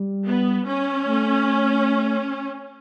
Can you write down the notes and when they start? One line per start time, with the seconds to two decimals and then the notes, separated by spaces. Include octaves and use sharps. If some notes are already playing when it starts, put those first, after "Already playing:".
Already playing: G3
0.26 B3
0.66 C#4
1.06 A3